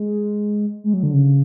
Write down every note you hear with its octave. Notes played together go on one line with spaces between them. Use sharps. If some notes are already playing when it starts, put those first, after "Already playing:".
Already playing: G#3
G#3
F#3
D3
C#3